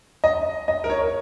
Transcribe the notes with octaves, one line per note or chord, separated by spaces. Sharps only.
D#5
D#5
A#4
C#5